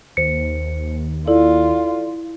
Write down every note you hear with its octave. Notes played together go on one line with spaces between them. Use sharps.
D#2 C5 C#7
E4 F4 A4 D5